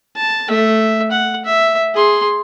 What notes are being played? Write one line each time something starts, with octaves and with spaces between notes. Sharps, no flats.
A5
A3 E5
F#5
E5
G#4 C6